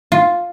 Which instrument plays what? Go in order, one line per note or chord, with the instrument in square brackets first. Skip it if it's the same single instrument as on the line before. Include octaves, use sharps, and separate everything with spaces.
[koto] F4